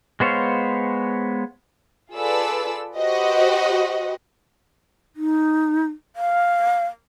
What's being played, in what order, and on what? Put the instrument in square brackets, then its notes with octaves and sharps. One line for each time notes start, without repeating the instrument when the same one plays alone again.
[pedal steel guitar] G#3 B3 C5 C#5 F5
[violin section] F4 G#4 A4 B4 D5 E6
F#4 G4 B4 C5 D#5
[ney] D#4
F5